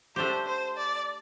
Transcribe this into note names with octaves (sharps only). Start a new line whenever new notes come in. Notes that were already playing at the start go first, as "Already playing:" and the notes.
A3 D4 G4 C5
C5
D5